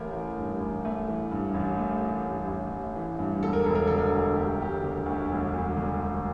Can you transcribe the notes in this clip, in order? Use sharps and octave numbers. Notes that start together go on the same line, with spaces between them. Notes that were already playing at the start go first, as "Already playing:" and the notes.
Already playing: A1 A3 A#4
E3
G2
A1
A3
E3
G2
A1
A3
E3
G2
A1
A3
E3
G2
E1 A4
A#4
E1 A4
A#4
D3 A4
A#4
D2 A4
E1 G4
E1 G4
D3
D2
E1
E1
D3
D2